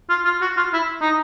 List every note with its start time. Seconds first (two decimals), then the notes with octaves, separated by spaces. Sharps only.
0.09 F4
0.25 F4
0.41 F#4
0.57 F4
0.73 E4
1.01 D#4